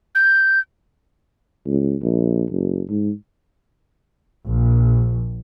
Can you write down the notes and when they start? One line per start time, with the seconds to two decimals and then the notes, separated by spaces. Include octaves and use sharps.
0.15 G6
1.66 C#2
2.02 A#1
2.51 F#1
2.89 G#2
4.45 A#1